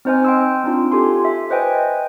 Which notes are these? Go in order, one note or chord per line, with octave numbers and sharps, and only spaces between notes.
C4 D#4 C5 D#5 G#5 F6
G5 C6 E6
C4 D4 D#4 F4
F4 G4 A4 G#5 C6
E5
B4 C5 D#5 G5 G#5